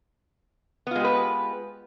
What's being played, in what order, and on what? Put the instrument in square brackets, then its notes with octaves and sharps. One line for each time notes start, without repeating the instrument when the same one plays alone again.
[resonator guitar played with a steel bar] B3
F4
G#3
G4
B4